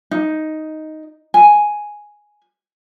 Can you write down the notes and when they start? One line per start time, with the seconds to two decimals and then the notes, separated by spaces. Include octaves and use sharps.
0.11 D#4
1.34 G#5